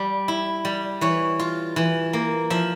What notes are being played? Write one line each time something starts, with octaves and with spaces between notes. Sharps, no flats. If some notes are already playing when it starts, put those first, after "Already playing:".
Already playing: G3
E4
G3
E3 C#5
F4
E3
A#3
F3 E5